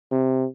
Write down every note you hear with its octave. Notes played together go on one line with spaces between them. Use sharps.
C3